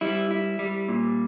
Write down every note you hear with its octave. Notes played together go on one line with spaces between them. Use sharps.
G3 E4
E4
G3
A#2